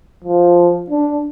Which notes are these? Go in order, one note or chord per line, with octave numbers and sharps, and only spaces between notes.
F3
D4